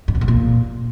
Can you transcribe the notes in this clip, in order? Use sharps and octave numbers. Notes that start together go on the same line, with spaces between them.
G2
B2
A2
A#2